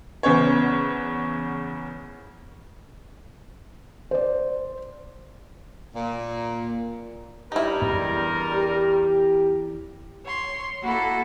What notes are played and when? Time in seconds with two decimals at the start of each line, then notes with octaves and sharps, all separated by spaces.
0.23 E2 C#3 B3 C#4 C5 C#5
4.11 C5 D5
5.95 A#2
7.52 G2 G3 D#4 E4 A#4
7.82 E2
8.54 G4
10.25 C#5 C6
10.82 A#3 E4 F#4 A4